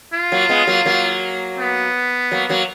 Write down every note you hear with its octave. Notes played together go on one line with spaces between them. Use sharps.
F4
F#3 A#3
G#3 B3
F#3 A#3
F#3 A#3
B3
F#3 A#3
F#3 A#3